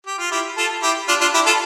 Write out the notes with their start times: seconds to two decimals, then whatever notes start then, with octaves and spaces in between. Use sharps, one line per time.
0.06 G4
0.19 F4
0.31 E4 G4
0.58 F4 A4
0.82 E4 G4
1.08 D4 F4
1.21 D4 F4
1.34 E4 G4
1.46 F4 A4